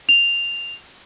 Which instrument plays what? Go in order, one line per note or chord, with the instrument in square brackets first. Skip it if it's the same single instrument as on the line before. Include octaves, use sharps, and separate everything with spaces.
[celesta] F7